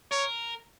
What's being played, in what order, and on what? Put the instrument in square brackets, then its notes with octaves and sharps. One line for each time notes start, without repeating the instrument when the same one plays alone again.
[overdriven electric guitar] A#4 [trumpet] C#5